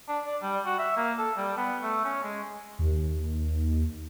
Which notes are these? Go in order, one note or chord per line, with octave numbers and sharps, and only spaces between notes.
D4
D5
G3
F#4
E5
A#3
A4
G3
B3
A3
C#4
G#3
D#2